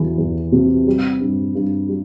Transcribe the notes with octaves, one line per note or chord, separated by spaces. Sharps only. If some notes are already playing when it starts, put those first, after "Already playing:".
Already playing: E2 E3
E2
C3
G3
G2
G2
G3